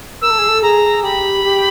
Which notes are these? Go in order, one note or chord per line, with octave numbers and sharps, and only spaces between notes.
A#4 E6
A4
G#4
A4
G#4 A#5
G4 B5
G4